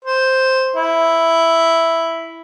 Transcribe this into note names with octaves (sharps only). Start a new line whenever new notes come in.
C5
E4